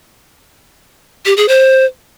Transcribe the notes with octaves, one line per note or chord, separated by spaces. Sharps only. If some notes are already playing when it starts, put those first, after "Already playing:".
G4
G#4
C5